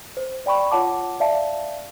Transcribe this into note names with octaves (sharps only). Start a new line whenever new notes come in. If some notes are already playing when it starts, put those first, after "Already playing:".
C5
D5 G5 B5 C#6
F4 C#5 F#5 A5 D6
D5 E5 F5 A5